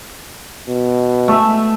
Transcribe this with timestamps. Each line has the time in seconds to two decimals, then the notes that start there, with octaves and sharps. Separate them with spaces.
0.68 B2
1.28 A3 E5